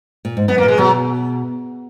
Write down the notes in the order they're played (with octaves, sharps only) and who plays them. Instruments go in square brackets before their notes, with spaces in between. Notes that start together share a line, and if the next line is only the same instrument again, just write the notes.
[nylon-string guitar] A#2
G#2
[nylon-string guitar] F#2 [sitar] B3
[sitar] A#3
[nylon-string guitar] A#2
[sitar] G#3
[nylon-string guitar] B2 [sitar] F#3